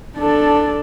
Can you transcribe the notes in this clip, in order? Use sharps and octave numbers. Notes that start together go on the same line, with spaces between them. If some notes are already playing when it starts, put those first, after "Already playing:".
D4 A4